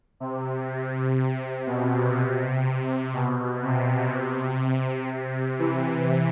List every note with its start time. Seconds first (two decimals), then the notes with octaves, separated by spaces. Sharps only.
0.20 C3
1.67 B2
2.16 C3
3.14 B2
3.62 C3
5.10 C3
5.59 C3 E3